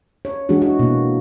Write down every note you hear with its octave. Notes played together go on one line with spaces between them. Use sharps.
C#5
E3 G#3 D4 F#4 G#4
E4 F#4
B2 A#3